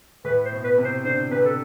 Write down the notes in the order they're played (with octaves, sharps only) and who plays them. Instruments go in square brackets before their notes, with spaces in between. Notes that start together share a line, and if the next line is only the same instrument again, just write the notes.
[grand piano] A2 [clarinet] B4
[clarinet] C5
[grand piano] B2
[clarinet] B4
[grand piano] C3
[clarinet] C5
[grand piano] D3 [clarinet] C5
[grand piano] C3 [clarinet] B4
[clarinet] A4